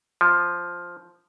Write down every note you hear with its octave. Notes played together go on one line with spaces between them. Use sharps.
F3